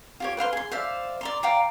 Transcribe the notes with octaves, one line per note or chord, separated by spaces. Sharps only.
F4 G4 C#5
B4 C5 F5 C6
G#4 C6
C5 D5 E5 F5
D5 A#5 C6
D5 F5 G5 A#5